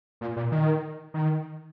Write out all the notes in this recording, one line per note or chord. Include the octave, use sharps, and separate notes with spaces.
A#2
A#2
D#3
D#3